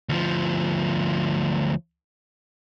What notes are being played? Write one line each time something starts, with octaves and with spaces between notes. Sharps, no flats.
D2 F3